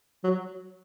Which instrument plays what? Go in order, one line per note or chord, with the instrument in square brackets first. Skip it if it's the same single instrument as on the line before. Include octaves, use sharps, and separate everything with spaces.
[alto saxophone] F#3